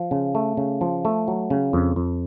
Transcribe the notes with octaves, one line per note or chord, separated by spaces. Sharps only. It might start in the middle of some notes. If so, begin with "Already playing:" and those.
Already playing: F3
C#3
A3
C#3
F3
A3
F#3
C#3
F2
F2